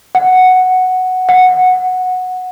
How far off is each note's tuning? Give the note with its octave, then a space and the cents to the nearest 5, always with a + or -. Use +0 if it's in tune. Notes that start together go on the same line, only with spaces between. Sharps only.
F#5 +0
F#5 -10